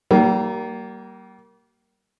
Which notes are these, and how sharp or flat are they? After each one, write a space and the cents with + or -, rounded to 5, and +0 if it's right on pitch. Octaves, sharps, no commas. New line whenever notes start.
G3 -35 A#3 +0